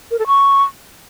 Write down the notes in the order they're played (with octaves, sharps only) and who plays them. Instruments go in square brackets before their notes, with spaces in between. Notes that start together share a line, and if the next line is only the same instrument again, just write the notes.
[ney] A#4
A4
C#6